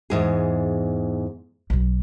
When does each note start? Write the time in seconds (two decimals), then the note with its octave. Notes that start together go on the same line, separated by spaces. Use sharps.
0.10 E2 G#2 G#4
1.70 B1 F#3